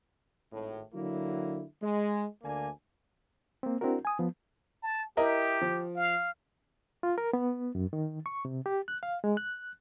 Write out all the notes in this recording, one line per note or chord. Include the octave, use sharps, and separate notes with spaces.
G#1 A2
D3 F#3 A#3 E4
G#3
D2 D3 A#3 D4 G#5
A#3 C4
C4 D4 E4 F#4 A#4
G#5 D#6
F3 B3
A5
E4 G4 A#4 D#5
F3
F5
F4
A#4
B3
F#2
D#3
C#6
C3
G4
F#6
F5
G#3
F#6